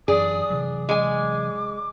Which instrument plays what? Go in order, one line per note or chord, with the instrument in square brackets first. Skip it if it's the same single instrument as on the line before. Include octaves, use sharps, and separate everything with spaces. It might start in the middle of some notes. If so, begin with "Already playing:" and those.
[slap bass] F#2 E3 [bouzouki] D4 D5 [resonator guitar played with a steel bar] G#4 [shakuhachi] D#6
[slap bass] C3 E3 F#3
[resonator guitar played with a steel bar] G#3 G#5 [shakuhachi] D6